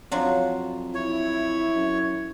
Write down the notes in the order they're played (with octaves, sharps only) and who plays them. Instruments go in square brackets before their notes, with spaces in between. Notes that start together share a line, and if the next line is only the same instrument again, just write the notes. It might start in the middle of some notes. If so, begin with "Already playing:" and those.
[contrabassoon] F2 [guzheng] F3 F#3 D4
[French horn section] E4 [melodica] C#5
[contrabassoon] F#2